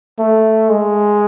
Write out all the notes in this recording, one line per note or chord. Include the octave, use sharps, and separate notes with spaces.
A3
G#3